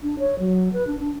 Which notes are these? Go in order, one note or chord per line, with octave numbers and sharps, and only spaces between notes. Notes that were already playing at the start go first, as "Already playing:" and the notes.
D4
C#5
F#3
B4
D4
D4